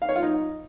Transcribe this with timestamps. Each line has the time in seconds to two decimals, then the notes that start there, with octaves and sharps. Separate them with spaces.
0.02 F5
0.09 C#5
0.16 F4
0.23 D#4